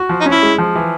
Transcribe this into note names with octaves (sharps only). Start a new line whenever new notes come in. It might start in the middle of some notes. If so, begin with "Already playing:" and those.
Already playing: F#4
F3
D#4
C#4
E4
G#3
F3
E3